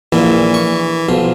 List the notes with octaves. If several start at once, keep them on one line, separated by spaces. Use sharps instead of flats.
A#1 A#2 E3
C#6
B1 F3